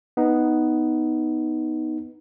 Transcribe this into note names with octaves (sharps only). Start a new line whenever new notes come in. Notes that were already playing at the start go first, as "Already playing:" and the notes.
B3 D#4